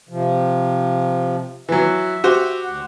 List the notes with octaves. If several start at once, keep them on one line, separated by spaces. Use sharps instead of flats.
C3 F3
E3 F#3 E5
F#4 G4 C5
D2 F#5